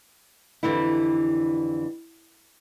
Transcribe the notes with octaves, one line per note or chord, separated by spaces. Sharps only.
F2 A#2 D3 E3 G3 E4